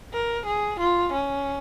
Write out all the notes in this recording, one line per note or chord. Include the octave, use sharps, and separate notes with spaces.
A#4
G#4
F4
C#4